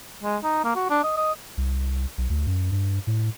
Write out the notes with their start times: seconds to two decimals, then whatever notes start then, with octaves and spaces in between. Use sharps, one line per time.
0.23 G#3
0.43 D#4
0.64 A#3
0.76 F#4
0.90 D4
1.03 D#5
1.17 D#5
1.57 C2
2.18 B1
2.30 D2
2.47 F#2
2.72 G2
3.07 A2